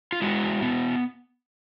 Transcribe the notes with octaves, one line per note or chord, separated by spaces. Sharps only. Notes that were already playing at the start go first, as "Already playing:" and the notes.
F4
G#3 E4 F#4
B3